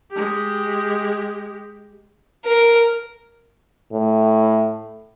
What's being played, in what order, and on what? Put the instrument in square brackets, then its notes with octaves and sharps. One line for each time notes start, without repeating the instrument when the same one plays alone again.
[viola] G#3 G4
[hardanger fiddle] A#4
[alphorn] A2